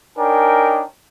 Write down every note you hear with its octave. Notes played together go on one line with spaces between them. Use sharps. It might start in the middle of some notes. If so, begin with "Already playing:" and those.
D4 D#4 A#4 C#5 G5 G#5